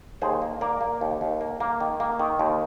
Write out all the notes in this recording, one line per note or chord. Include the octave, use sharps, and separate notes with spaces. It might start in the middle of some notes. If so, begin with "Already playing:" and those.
D#2 G#4 C5
A#3
A#3 A#4 D5
A#3
D#2
D#2
A#3
A#3
D#3
A#3
D#3
D#2